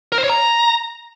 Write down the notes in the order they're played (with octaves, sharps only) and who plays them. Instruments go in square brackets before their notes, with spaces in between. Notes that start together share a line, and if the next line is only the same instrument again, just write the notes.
[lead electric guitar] A#4
C5
C#5
A#5